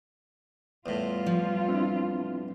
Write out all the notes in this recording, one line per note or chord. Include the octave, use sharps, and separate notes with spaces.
E2 A2 G3 F4
F3
C4 D4 E4